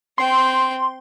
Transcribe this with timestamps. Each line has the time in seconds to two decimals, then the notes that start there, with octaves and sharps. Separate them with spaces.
0.18 C4 G5 C6